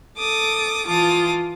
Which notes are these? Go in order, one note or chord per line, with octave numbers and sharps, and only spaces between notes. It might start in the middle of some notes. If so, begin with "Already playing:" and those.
A4 D6 D#6
E3 F4 A5 D6 D#6